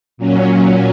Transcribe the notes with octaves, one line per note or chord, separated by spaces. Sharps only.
A#2 F#3 C#4